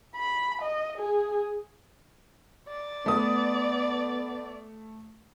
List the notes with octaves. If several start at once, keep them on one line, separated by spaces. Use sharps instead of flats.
B5
D#5
G#4
D5
A3 B3 D#6